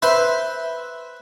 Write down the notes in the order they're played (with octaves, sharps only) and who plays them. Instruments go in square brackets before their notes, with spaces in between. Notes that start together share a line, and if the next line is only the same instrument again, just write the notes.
[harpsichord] B4 C5 C6 [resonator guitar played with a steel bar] E5